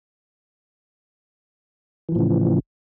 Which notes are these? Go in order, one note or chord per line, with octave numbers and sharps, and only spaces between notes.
A2 C#3 E3 F3